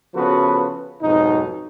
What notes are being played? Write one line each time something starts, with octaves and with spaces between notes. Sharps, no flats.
C#3 F3 B3 F#4 A4 B4
B1 F2 G#2 B2 D#4